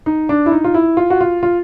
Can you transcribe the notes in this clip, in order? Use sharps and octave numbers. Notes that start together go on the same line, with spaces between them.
D#4
D4
E4
D#4
F4
E4
F4
F#4
F4
F4